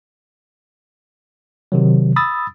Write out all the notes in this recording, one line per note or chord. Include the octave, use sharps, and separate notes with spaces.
C3 D#3 F#3
B5 D#6 E6 A6